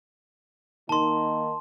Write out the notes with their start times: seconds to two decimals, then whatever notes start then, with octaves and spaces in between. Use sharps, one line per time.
0.89 D#3 A#3 D#4 A5 C6